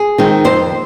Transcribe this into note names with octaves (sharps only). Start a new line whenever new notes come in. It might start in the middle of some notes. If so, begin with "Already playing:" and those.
Already playing: G#4
D#3 G#3 C4
F2 C5